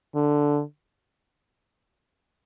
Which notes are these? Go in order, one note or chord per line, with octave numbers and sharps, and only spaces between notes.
D3